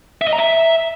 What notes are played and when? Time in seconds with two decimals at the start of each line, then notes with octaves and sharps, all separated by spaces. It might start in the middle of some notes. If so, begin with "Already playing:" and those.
0.21 E5
0.27 D#5
0.33 A#5
0.38 E5